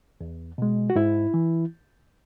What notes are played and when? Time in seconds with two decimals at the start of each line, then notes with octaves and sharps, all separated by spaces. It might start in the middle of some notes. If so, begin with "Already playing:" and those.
0.21 E2
0.58 B2 G#3
0.90 F#4
0.96 G#2 E4
1.34 E3